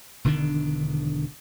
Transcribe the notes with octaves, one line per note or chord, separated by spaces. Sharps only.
E1 D3 D#3 D4